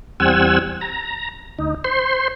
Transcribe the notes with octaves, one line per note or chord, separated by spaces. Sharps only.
E2 G3 C4 F#5 G#5 E6
A#5
D2 D#4
C5 C6